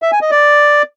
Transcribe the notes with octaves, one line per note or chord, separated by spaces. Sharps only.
E5
G#5
D#5
D5